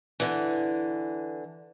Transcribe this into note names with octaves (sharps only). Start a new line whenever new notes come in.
D3 E3